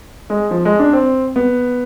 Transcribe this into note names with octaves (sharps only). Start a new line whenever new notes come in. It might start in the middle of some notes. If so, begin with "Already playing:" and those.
G#3
F3
G#3
D4
C4
B3